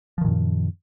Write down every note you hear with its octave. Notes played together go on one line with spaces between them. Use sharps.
F#2 A#2 D#3 F3